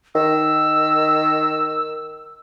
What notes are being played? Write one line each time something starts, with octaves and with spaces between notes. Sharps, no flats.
D#3 E6